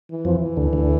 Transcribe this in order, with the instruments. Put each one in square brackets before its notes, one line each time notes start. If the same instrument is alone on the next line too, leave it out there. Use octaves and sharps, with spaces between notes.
[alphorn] E3
[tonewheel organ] F2 F3
[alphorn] E3
[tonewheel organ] D2 D3
D2 D3